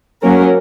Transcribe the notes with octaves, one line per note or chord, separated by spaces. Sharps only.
F#3 A#3 C#4 A#4